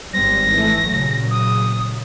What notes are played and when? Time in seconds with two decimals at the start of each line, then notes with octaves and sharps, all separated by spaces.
0.14 G#1 G3 C4 A#6
0.51 E3 A3
0.88 A#2 C#3 F#3
1.31 D#6